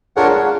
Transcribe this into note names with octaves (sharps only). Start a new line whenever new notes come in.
D4 F4 G#4 A#4 C#5 F#5